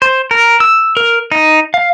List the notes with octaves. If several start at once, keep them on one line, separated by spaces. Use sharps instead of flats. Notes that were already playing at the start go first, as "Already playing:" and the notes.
C5
A#4
E6
A#4
D#4
F5